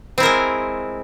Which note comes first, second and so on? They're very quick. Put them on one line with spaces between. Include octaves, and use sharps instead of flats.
C4 E4 A#4 G#3